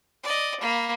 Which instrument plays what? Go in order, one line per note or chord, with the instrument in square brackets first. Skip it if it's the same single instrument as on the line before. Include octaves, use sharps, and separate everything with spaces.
[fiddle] D5 D#5
A#3 B5